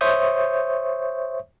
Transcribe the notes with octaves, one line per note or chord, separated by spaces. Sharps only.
C5 C#5 E5 C#6 D#6 G6